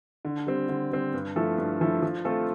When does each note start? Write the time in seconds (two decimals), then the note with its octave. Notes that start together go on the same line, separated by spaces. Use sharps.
0.25 D3
0.47 G3 C4
0.69 D3
0.91 G3 C4
1.14 G2
1.36 F3 A3 E4 A4
1.58 G2
1.81 F3 A3 E4 A4
2.02 F3
2.25 A3 C4 F4 A4